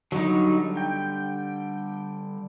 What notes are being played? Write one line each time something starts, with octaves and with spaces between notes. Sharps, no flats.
D3 F#3 G3 D#4
G5